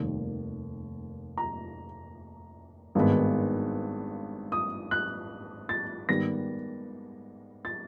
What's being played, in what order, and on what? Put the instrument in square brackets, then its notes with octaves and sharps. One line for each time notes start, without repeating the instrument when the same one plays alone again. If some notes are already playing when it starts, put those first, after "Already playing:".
Already playing: [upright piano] F1 D#2 D#3 G3
A#5
G#1 G2 D#3 G#3 B3
D#6
F#6
A6
G#2 D#3 G3 B3 A#6
A6